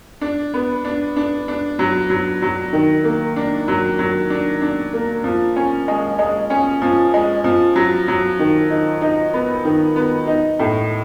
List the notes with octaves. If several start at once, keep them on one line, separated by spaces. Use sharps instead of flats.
D4
B3
D4
D4
D4
F#3
F#3
F#3
D#3
A#3
D4
F#3
F#3
D4
D4
A#3
F3
C#4
G#3
G#3
C#4
F3
G#3
F3
F#3
F#3
D#3
D#4
D#4
B3
D#3
B3
D#4
A2